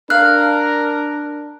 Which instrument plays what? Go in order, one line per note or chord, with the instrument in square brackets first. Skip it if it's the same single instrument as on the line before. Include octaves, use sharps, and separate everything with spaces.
[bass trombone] D4 [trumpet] A#4 [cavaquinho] F5 [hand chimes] F#6